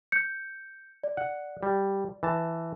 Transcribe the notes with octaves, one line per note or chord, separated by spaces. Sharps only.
G6 C#7
D5
F#5
G3
E3 A5